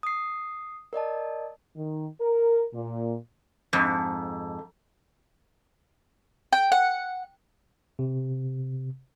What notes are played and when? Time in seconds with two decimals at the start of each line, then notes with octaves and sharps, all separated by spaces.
0.03 D#6 C7
0.93 A#4 D5 D#5 A5
1.76 D#3
2.21 A#4
2.74 A#2
3.73 F2 G#2
6.52 G5
6.72 F#5
7.99 C3